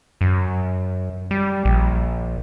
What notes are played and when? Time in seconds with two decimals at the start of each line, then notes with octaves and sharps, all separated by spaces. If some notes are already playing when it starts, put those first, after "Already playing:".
0.21 F#2
1.31 G3
1.65 A#1